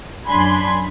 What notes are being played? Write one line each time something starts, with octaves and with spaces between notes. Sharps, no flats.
F#2 D4 G#5 B5 C6 G#6